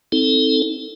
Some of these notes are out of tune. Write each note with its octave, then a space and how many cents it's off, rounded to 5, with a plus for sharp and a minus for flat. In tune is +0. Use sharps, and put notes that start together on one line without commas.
C4 +0 D#4 +30 A4 +0